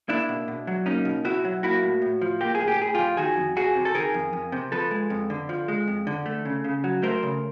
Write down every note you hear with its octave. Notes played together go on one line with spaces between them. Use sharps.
A#3 D4 E4
B2
B2
F#3
A#3 C#4 D#4
B2
B2 E4 F#4
F#3
A#3 E4 F#4
A2
A2
F3
A#3 G4
G#4
A2
G4
A2 G#4
F3 F4 G4
D#3 F#4 G#4
F2
F2 F#4 G#4
C3
A4
D#3 G#4 A#4
F2
F2
C3
F3 A4 B4
G#3
F2
D3
F3
G#3
F2
D3
A3
C#3
C#3
F#3
A3 A#4 C5
C#3